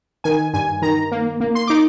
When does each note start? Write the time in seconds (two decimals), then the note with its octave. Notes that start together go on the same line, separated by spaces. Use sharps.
0.24 D#3 G#5
0.54 G2 G#5
0.82 D#3 A#5
1.12 A#3
1.40 A#3
1.55 C6
1.67 D#4 D6